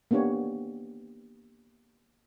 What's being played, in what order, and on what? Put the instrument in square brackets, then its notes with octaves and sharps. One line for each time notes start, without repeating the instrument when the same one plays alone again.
[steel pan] A#3 B3 D4 G4 C#5